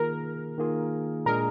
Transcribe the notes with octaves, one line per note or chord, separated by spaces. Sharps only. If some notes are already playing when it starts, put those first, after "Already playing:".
Already playing: D#3 A#3 F4 G#4 A#4
D#3 A#3 F4 G#4
A#2 G#3 D4 G#4 A#4